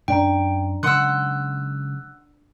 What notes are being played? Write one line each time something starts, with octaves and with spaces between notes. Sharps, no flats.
F#2 C#4 D4 D5 G5 A#5
C#3 F#3 G#3 F#5 C6 D#6 E6 F#6